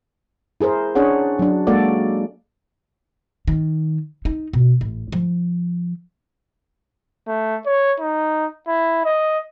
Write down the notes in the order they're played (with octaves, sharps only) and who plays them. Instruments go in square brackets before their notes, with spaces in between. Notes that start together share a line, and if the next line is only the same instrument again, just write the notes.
[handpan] E4 G#4 A#4 C5
C#4 D4 G#4 C#5 F#5
F#3 D4
G#3 A#3 F#4 A4 D5
[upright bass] D#3
D#4
B2
A1
F3
[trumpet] A3
C#5
D#4
E4
D#5